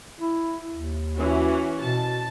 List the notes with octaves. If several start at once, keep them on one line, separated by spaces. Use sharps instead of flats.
E4
D#2
E3 C#4 F#4
B2 A5